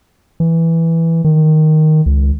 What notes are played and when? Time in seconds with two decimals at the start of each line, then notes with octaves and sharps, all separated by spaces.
0.40 E3
1.24 D#3
2.06 C#2